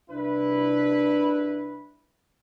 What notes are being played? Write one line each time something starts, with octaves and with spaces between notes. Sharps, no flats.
C2 D4 E4 B4